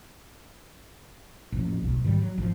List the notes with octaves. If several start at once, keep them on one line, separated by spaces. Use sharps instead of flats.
A1 F2 A#2
D1 B1
G#2 D#3 F#3 G3
F#3
G#1 F3